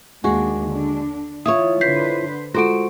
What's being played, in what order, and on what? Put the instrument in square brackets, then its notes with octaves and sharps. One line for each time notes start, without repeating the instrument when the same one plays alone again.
[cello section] D#2 A#3 D4 [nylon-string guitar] G#3 F#4
[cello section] D3 D4
[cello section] E3 [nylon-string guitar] E4 F4 C#5 [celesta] D#6
[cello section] D3 B4 C5 [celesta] G6 B6 C7
[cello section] G#3 [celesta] F4 A4 D7 [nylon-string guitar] F#4 C5